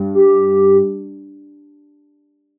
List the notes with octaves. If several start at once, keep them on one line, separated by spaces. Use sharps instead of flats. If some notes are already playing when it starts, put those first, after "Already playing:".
Already playing: G2
G4